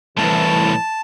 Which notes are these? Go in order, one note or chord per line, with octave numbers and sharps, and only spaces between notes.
C2 A2 E3 A5